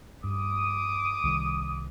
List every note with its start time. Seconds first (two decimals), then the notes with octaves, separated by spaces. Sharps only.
0.24 G2 D6 D#6
1.24 C2 D#3 G3